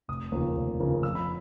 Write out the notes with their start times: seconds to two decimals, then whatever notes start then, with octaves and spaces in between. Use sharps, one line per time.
0.08 F1 D#6
0.32 D#2 C#3 F3 A#3
0.56 F1
0.80 D#2 C#3 F3 A#3
1.03 F2 E6
1.15 B5